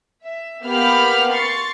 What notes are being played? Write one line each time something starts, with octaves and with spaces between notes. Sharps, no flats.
E5
A#3 B3 G4 F5 B5 F6
C6 C#6 A6 C7 C#7